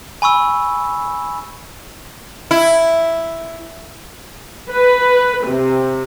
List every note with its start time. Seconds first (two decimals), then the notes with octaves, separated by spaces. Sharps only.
0.22 G#5 B5 C#6 E6
2.51 E4
4.70 B4
5.46 C3